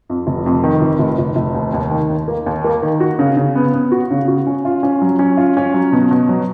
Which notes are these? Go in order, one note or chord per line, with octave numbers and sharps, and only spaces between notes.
F2
F1
F2
D#3
F1
F1
F1
F1
D#2
D#2
D#3
D#2
A#3
D#2
A#3
D#3
F#4
C#3
C#3
B3
B3
F#4
C#3
F#4
C#4
F4
C#4
F#3
C#4
F4
C#4
F#3
B2
B2
F#3